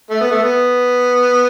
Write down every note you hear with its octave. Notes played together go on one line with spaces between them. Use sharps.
A3
B3
A3
B3